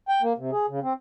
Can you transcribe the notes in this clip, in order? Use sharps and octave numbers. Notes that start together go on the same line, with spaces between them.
G5
A#3
C3
G#4
C#3
C4